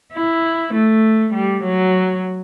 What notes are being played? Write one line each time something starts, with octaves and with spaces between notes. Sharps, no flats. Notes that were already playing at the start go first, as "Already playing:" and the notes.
E4
A3
G3
F#3